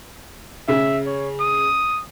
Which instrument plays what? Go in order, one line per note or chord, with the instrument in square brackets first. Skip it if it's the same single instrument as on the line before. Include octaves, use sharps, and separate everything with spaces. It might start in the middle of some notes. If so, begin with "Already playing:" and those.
[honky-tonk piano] C#3 [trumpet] E5
[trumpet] C#5
D#6